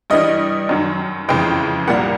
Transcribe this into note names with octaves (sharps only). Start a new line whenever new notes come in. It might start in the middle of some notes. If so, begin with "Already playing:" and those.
G2 E3 G3 D#5
F#2 D#3 F#3
F2 C#3 E3 G#3 G5
C2 A#2 G3 A#3 F#5